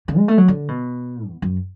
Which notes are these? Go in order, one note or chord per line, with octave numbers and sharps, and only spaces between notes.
C#3
G#3
A3
F#3
D3
B2
E2
F#2